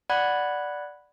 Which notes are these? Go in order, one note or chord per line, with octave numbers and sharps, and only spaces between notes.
D5 F#5 B5 F#6 G#6